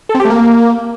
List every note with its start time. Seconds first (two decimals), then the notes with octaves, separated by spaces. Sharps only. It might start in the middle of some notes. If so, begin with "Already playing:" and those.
0.09 A4
0.15 C4
0.20 G4
0.25 A3
0.30 A#3